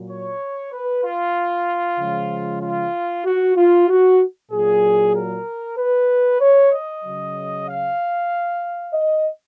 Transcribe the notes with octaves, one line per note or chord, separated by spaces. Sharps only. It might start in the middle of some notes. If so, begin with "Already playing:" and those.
Already playing: A#2 F#3
C#5
B4
F4
C#3 F3 G#3
F4
F#4
F4
F#4
A#2 F#3 G#4
A#4
B4
C#5
D#5
C#3 F#3
F5
D#5